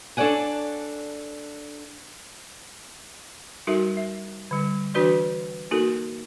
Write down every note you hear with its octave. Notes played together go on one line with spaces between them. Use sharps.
D4 A4 C#5 D5 F#5 G#5
G3 D#4 F#4 A4 A#4 E5
E5
D3 G3
E3 D4 F#4 B4 D5 C6
A#3 D#4 F#4 A4 A#4